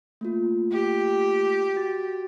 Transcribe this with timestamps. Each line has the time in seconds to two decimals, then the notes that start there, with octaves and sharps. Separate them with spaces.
0.21 A3 A#3 F4
0.72 G4
1.76 F#4 A6